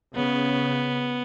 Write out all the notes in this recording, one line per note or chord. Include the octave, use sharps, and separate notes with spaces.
C#3 B3